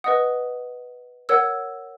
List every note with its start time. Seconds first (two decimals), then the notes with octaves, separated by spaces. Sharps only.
0.04 B4 D#5 F#5 D#6
1.29 A#4 C#5 F#5 E6